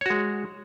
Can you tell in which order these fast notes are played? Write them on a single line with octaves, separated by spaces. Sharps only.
C#5 F#4 G#3